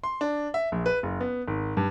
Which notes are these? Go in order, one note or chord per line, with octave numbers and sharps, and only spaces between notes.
C6
D4
E5
A#1
B4
F#1
B3
G#1
G2